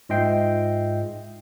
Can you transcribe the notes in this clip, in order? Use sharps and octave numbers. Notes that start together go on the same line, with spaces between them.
G#2 F4 D#5 E5 G5 C7